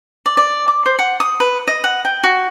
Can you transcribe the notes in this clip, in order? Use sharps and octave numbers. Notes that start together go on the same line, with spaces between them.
D5
D5
D6
C5
F#5
D#6
B4
D#5
F#5
G5
F#4